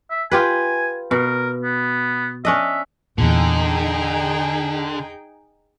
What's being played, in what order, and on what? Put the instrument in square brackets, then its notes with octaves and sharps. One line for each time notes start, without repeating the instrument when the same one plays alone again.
[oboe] E5
[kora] F4 G4 B4 [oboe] G#5
[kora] B2 [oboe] A#4
[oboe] B3
[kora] C#4 D4 D#5 [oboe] E5
[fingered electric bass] E2 A#2 [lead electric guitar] D3 [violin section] D#4 G#4 G5